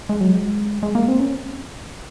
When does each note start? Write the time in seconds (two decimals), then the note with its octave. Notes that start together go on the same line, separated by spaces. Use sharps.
0.09 G#3
0.21 F#3
0.32 G#3
0.83 G#3
0.95 A#3
1.08 C4
1.20 C#4